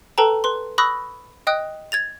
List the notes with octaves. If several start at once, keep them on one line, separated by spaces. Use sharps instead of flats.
A4 B4 G5 A5 A#5
B4 C6
B5 C#6 D#6 E6 F#6 A#6
D#5 G5 D#6 F#6
G#6 A6 F7